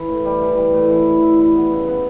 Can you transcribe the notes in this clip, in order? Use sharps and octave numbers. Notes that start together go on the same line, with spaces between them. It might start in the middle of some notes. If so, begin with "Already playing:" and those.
Already playing: E3
A2
G3
E3
G3
A2
E3
E3
E4
E4
B3
C#3
B3